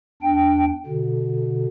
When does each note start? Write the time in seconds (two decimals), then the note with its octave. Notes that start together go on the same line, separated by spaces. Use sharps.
0.22 E2 D4 G5
0.86 B2 D3